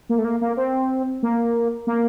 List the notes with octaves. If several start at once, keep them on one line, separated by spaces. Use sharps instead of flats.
A#3
A3
A#3
A#3
C4
A#3
A#3